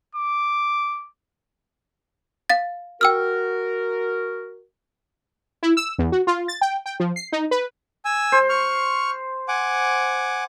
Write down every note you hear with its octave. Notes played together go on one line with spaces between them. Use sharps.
D6
F5 A6
F#4 A#4 G5 E6 F6
E4
E6
E2
F#4
F4
A6
G5
G5
F3
C7
D#4
B4
G#5 E6
C5
C#6 F6
F#5 G#5 D6